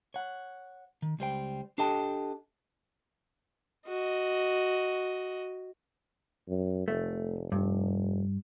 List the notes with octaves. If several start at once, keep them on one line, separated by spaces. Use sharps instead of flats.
C#5 F#5
D#3
C#2 G3 C5 G5
D4 G4 A4 D#5 G5 A5
F#4 D#5
F#2
F1 A3
G2